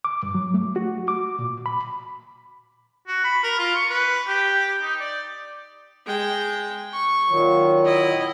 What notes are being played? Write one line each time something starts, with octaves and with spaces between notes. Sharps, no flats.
D6
G2
F#3
A3
F#4
D6
A#2
B5
F#4
B5
A#4
F4
C#6
B4
G4
D#4
D5
G#3 G5
C#6
A#2 D#3 F#3
E4 D#5